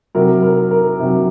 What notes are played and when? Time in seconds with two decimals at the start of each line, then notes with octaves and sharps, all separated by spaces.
0.15 C3 F#3 A#4
0.43 A#4
0.71 A#4
1.00 C3 F#3